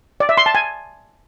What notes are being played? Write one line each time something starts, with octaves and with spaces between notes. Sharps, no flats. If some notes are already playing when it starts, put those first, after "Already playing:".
D5
E5
C6
A5
G#5